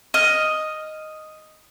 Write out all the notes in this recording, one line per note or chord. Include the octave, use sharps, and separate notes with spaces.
D#5 F6